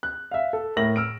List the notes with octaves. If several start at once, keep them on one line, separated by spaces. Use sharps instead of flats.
F#6
E5 F5
A4
A2 A#4 E5 A#6 F#7
E6 F6 D7